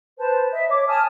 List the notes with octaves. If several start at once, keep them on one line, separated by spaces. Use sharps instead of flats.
B4 C5 A5
D#5 E5
C#5 D6
G#5 A5 D#6 F6